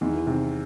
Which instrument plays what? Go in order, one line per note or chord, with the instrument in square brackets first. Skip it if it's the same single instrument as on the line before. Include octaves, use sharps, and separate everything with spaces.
[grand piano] E2 [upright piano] D#3
[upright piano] E3
C3 D#3